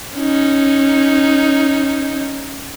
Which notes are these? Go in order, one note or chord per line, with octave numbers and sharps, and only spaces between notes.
C#4 D#4